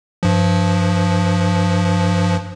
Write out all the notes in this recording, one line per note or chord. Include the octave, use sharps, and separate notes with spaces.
G2 F3